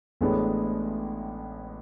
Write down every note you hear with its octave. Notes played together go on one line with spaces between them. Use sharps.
A1 A2 G#3 B3 D4